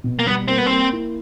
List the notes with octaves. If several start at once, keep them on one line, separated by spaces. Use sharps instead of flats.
B2
A#3
G3 B3
A#3 C4
B3
A#3 C4
E4